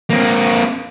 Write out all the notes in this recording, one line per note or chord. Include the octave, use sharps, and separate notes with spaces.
A#3 C4